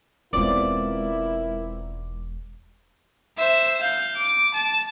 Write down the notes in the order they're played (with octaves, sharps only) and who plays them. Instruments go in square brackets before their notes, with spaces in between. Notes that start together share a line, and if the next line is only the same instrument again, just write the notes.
[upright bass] E1 G#3 [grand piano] B3 C4 F4 [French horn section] E4 A#4 [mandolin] D5
[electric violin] C5 E5
F5 G6
D6
A5